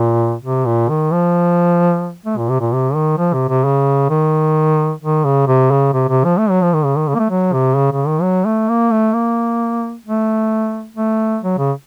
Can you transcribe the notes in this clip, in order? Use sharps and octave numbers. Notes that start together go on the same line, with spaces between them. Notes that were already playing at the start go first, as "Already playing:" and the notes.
Already playing: A#2
C3
A#2
D#3
F3
A3
A#2
C3
A#2
C3
D#3
F3
C3
C3
C#3
D#3
D#3
C#3
C3
C#3
C3
C3
F3
A3
F#3
F3
D#3
C#3
D#3
C#3
A#3
A3
F#3
C3
C#3
C#3
D#3
F#3
A3
A#3
A3
A#3
A3
A3
F#3
C#3